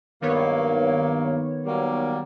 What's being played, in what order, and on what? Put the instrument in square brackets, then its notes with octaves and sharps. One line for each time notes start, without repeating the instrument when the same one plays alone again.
[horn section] G2 F#3 A#3 [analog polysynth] D#3 B3 C#5
[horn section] F#3 G3 A#3